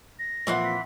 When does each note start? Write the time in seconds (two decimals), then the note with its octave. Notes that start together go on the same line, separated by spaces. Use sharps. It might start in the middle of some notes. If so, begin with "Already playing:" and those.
0.19 A#6
0.47 A#2 E3 F3 C4 F#5
0.64 B6